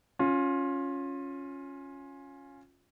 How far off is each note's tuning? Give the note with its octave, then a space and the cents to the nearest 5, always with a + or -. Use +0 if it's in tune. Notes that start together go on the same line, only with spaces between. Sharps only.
C#4 +0 F4 +20